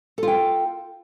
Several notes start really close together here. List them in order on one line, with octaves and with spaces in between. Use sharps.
A4 F4 G5